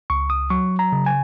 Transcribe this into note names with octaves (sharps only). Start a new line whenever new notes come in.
C#2 C#6
D#6
F#3 C#6
A#5
C#3
G#5